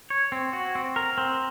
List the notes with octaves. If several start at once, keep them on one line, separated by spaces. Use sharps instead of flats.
C#5
C4
F#4
C4
A#4
C4